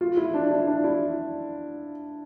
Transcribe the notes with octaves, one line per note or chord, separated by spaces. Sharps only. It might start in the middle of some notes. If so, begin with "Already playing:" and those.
F4
E4
D4
E4
D4
E4